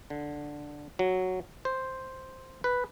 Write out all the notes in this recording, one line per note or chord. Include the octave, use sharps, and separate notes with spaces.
D3
F#3
C5
B4